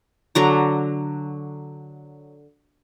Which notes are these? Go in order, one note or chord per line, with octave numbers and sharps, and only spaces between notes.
D3 F#3 A#5